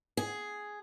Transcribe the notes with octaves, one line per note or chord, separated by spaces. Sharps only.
G#4